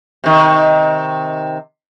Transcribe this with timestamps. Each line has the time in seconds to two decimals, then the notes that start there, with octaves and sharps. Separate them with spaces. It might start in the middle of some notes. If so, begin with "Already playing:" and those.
0.24 C3 D#3